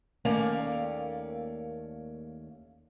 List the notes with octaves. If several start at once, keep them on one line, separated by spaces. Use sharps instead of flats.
D#2 A3 A#3 C#4 D5 F5